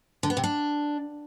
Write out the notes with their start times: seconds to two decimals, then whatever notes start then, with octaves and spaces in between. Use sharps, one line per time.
0.23 D3
0.30 B3
0.37 C3
0.44 D4